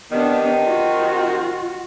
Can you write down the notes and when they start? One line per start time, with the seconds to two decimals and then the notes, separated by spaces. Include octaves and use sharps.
0.11 C3 D#3 B3 D4
0.66 F4 F#4